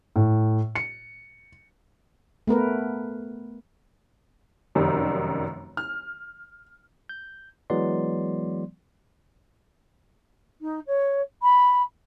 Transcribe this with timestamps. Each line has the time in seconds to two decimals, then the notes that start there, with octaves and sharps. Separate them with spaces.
0.16 A2
0.75 C#7
2.47 A3 B3 A#4 B4
4.75 F1 F#2 D#3 G3
5.77 F6
7.09 G6
7.70 E3 F#3 G#3 B3 D5 C6
10.61 D#4
10.87 C#5
11.42 B5